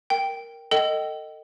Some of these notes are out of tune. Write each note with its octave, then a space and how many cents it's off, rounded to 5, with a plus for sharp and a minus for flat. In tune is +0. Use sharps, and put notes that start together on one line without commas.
A#4 +0 G5 +0
A4 +30 D#5 +0 G5 -30